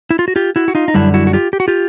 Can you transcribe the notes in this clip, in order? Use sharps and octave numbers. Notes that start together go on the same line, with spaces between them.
E4
F4
F#4
F4 G4
E4 F#4
F#4
D#4 F4
D#4
F#2 D3 G3 D4 E4
E4 F#4
F#4
F4 G4
G4
F#4
F4 G4